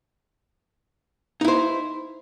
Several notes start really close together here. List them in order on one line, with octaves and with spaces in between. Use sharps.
D#4 E4 C5